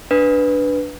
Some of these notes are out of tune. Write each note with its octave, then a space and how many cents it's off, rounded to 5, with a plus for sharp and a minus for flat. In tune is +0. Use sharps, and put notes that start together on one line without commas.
D4 +0 B4 +0